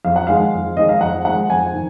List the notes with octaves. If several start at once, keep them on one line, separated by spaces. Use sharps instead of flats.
F2 F5
F#5
D#3 G#3 F5
F2
D#3 G#3 D#5
F5
F2 F#5
D#3 G#3 F#5
F2 G#5
D#3